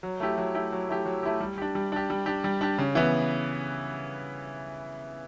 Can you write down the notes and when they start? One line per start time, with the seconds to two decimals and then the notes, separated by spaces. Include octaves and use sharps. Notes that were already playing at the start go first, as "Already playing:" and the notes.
0.03 F#3
0.20 A3 E4 G4
0.38 F#3
0.54 A3 E4 G4
0.72 F#3
0.89 A3 E4 G4
1.06 F#3
1.23 A3 E4 G4
1.40 G3
1.58 D4 G4
1.75 G3
1.92 D4 G4
2.10 G3
2.26 D4 G4
2.44 G3
2.61 D4 G4
2.78 C#3
2.95 E3 B3